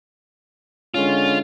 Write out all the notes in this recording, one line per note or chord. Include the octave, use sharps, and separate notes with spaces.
D3 G#3 C#4 F4